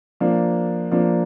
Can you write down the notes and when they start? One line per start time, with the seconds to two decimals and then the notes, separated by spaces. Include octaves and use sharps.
0.20 F3 A#3 D4
0.91 F3 A#3 D4